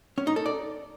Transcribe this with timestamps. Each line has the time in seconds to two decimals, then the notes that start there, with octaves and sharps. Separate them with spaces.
0.18 C#4
0.27 D#4
0.36 A4
0.46 D5